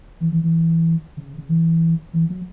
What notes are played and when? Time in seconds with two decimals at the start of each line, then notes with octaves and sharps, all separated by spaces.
0.21 E3
0.32 E3
0.43 E3
1.17 C#3
1.38 C#3
1.49 E3
2.13 E3
2.29 F#3